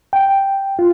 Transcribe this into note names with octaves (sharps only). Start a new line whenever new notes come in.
G5
F4